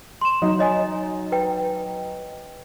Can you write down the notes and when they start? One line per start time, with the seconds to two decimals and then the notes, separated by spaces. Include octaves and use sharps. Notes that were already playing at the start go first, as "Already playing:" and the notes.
0.21 C6 E7
0.42 F#3 D#4
0.59 C#5 D#5 G#5
1.32 B4 G5